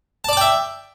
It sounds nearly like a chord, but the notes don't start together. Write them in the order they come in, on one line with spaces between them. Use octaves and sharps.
A5 D5 D6 G5 E5